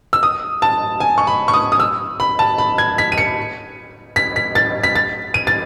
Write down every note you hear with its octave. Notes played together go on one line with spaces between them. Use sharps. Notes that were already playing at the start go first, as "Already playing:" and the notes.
E6
D#6
A5
G#5
C#6
B5
C#6
D#6
D#6
E6
B5
A5
B5
G#6
B6
D#7
C#7
B6
B6
A6
B6
A6
D#7
A6